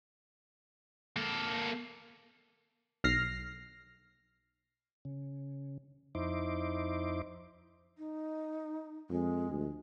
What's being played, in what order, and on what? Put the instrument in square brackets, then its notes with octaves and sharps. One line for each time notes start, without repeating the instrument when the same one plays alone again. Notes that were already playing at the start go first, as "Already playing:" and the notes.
[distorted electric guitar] A#3 A4
[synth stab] B1 F6 A#6 C7
[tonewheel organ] C#3
F2 D#4 E4 C5 D6
[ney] D#4
[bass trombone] F2 [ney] G#3
[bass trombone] D2